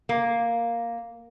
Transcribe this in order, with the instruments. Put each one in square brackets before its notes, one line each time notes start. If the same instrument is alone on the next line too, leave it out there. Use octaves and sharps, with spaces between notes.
[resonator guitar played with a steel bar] A#3